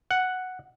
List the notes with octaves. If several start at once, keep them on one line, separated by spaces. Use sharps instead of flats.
F#5